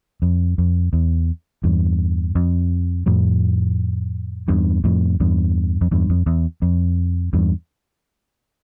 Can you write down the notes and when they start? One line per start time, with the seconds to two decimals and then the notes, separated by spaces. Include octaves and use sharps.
0.22 F2
0.58 F2
0.93 E2
1.64 E2 G2
2.35 F2
3.06 F2 A2
4.48 E2 G2
4.84 F2 A2
5.20 E2 G2
5.81 F2
5.91 E2 G2
6.10 F2
6.26 E2
6.62 F2
7.33 E2 G2